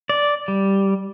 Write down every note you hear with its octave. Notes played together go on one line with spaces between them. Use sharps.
D5
G3